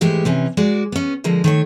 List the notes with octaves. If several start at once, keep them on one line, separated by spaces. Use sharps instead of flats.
G#2 E3 G#3 A3 G4
C3 E3 C#4
G#3 F#4 D5
B3 C#4
D3 F3 G#3 A#4
D#3 A3 C#5